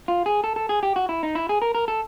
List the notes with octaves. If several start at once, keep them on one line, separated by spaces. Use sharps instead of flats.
F4
G#4
A4
A4
G#4
G4
F#4
E4
D#4
E4
G#4
A#4
A#4
A4